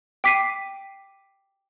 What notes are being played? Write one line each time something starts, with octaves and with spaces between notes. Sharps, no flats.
G5 D6 B6 C7 D#7